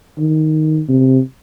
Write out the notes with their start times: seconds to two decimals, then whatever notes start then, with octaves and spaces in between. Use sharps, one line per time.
0.18 D#3
0.89 C3